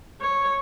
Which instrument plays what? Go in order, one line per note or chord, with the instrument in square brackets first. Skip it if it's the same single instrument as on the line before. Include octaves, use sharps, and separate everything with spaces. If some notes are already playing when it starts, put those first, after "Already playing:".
[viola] C#5